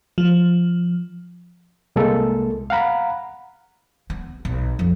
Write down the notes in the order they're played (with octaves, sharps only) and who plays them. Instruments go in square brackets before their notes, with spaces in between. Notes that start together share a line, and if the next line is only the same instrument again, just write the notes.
[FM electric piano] F3
[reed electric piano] C2 G#3 A#3 A4
F5 F#5 A#5 B5
[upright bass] B3
B1
F2